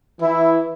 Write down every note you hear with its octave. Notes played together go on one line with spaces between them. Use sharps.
E3 E4